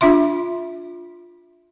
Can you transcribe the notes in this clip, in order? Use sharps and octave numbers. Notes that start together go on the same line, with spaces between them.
D4 F4 E5 C6